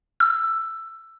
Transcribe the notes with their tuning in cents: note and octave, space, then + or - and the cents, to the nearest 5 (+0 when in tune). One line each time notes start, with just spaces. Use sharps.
E6 +10